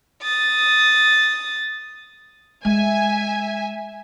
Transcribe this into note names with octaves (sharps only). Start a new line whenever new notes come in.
D#6 A6
G#3 E5 G#5